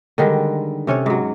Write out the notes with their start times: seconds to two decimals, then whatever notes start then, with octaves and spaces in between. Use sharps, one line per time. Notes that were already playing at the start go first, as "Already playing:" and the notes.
0.18 D3 D#3 G3 G#3
0.87 C3 C#4 A4 C#5
1.06 G#2 F#3